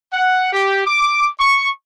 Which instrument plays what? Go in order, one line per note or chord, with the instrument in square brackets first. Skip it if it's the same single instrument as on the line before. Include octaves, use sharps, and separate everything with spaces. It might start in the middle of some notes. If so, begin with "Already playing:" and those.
[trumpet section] F#5
G4
D6
C#6